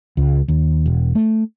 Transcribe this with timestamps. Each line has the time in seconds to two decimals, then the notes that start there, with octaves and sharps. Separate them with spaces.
0.17 C#2
0.48 D#2
0.86 E1
1.15 A3